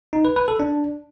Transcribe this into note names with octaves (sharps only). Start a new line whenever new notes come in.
D#4
B4
B4
A4
D4